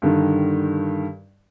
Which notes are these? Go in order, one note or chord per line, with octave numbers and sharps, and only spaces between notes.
G2 D3 D#3